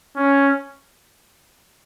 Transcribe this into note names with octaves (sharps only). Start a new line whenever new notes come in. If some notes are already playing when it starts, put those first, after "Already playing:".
C#4